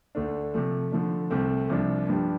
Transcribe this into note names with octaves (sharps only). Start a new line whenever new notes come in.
D2 D3 A3 D4
C3 F3 A3
D3 F3 A3 D4
C2 C3 A3 C4
C2 C3 F3 D4
G2 F3 D4 G4